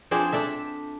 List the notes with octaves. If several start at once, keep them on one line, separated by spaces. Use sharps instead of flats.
F3 C4 D4 G#4
D4 A4 E5